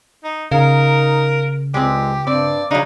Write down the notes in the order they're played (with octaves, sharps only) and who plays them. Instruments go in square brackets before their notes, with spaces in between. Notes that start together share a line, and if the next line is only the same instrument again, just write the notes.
[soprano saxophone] D#4
[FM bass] C#3 [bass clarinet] D#4 [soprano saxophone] A#4 [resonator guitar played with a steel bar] F5
[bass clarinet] C#2 [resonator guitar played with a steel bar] G#3 C4 [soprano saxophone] G4
[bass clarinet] G2 [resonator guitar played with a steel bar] C4 [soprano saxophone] D5
[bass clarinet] C#3 [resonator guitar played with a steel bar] F#3 D4 [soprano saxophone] D#4